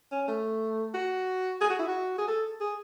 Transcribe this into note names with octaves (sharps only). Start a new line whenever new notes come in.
C#4
A3
F#4
G#4
F#4
E4
F#4
G#4
A4
G#4